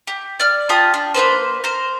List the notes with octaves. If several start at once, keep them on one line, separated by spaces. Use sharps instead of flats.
G4
D5 F6
F4 G4 A5 D#6
D4
A#3 E4 B4 C5
A#4 C5